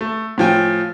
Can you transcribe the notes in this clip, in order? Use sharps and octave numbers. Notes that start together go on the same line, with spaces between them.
A3
A2 F3 G5 G#5